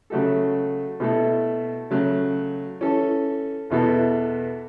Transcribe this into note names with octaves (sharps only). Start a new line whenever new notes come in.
C#3 F#3 A3 F#4 A4
B2 A3 E4 A4
C#3 F#3 A3
E3 C#4 A4
E2 B2 B3 E4 A4